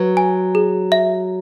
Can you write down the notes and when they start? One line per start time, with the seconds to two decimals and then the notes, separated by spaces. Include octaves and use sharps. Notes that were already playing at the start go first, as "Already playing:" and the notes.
Already playing: F#3 B4
0.17 G#5
0.55 G#4
0.92 E5